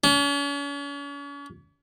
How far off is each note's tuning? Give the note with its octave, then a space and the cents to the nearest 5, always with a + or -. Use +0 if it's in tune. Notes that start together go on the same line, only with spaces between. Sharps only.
C#4 +40